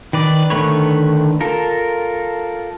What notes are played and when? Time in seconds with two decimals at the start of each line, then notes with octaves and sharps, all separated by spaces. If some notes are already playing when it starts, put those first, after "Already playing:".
0.13 D#3 B4 D5
0.50 D3 D#3 A3 B4 C#5
1.41 F4 A4 A#4